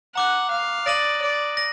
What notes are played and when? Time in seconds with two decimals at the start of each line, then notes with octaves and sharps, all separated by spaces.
0.15 F#5 A#5 D6 F#6
0.51 F5
0.86 D5 D#6 A#6 D#7 F#7
1.22 D5
1.57 A#6